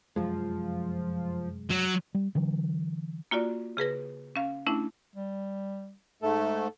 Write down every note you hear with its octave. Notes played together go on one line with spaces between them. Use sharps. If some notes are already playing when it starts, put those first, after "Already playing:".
F1 F#2 F3 G#3
F#3
G3
D3 E3 F#3
A#3 F4 F#4 D5
C#3 G#4 B4 A#6
C#4 F5
A3 C#4 D4 E4
G3
G#2 A3 A4